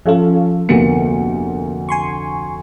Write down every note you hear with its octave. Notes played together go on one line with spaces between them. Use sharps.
F3 C#4 F4 A4 F5
F1 D2 A#3 B3 G4 C#7
G#5 C6 C#6